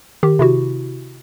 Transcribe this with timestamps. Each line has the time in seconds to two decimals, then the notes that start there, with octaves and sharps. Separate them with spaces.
0.23 D#3 G4
0.39 C3 E4 F#4